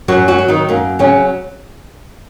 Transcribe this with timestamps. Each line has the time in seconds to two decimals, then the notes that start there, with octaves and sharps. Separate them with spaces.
0.08 F#2 F#3 F#4
0.28 F#3 F#4
0.38 F#3
0.48 D#3 D#4
0.69 F#2 A#3
0.99 C#3 F#3 C#4